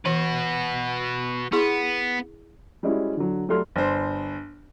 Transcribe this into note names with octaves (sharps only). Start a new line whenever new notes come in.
E3 F#4 B4
B3 E4 G#4 C6
G3 G#3 C#4 E4 F#4
D3 F#3
F#3 G3 A3 A4 C6 F6
G1 C5